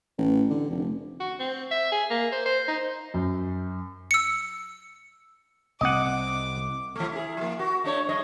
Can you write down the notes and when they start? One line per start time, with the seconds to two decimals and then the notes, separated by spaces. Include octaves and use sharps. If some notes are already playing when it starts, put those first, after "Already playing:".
0.18 A1
0.50 D3
0.70 F1
1.20 F#4
1.40 C4
1.71 E5
1.92 G#4
2.10 A#3
2.32 C5
2.46 C5
2.68 D#4
3.14 F#2
4.11 E6 C#7
5.81 C2 C4 D#5 F#5 D6
6.96 E3 A3
7.12 E4 G#4
7.37 F3 A#3
7.59 F#4
7.84 A3 D4 C#5
8.09 G2 C#5 D#5